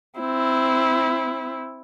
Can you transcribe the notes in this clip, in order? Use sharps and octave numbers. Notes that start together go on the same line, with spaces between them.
C4 E4